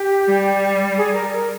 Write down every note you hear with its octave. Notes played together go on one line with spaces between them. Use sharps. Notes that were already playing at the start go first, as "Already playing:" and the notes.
Already playing: G4
G3
G#4
A#4
A#4